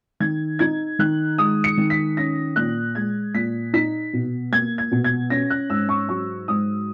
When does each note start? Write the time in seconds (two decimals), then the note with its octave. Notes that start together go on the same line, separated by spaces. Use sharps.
0.20 D#3 G#6
0.59 D#4 G#6
0.99 D#3 F#6
1.38 G#3 D#6
1.64 C#7
1.77 D#3
1.90 B6
2.17 C#4 A#6
2.56 A#2 F#6
2.95 G#3 G#6
3.34 A#2 B6
3.73 D#4 B6
4.13 B2
4.52 A#3 G#6
4.78 G#6
4.91 B2
5.04 G#6
5.30 C#4 A#6
5.50 F#6
5.70 G#2 E6
5.89 C#6
6.09 F#3 C#6
6.48 G#2 D#6